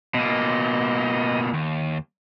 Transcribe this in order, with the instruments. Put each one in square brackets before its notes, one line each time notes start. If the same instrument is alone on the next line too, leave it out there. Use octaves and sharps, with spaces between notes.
[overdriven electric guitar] B2 A#3 [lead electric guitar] D#5
[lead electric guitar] D#2